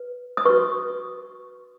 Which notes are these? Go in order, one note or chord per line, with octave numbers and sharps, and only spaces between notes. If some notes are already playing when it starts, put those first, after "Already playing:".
Already playing: B4
D#6
F#4 B4 C#6